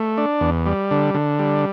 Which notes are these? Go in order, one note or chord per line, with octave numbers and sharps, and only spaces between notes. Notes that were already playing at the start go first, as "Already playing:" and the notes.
Already playing: A3
D4
E2
G3
D3
D3
G3